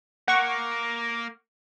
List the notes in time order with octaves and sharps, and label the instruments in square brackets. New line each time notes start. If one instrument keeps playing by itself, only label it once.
[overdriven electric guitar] A#3 [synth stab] F#5 C#6